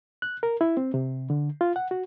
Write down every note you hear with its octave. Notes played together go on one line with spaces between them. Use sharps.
F#6
A#4
E4
C4
C3
D3
F4
F#5
F#4